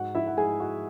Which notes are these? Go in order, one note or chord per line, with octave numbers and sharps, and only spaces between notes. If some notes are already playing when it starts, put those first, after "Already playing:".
Already playing: G#2 F#4 F#5
E4 E5
F#5
G#2 G#4 G#5
F#4 F#5